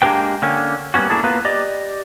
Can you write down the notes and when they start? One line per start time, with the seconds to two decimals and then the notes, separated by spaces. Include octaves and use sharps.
0.02 G#3 A#3 D4 G4 B4 G5
0.42 D3 A#3 C#4
0.94 G3 A#3 B3 C#4 F#4
1.10 A#3 D4 E4 G#4 A4
1.24 A#3 B3 F4 F#4 B4
1.45 G4 D5 D#5